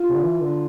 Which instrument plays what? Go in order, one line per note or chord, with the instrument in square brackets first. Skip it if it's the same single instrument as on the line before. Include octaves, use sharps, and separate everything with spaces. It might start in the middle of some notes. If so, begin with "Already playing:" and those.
Already playing: [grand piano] F4
[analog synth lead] C3
D3
E3
D3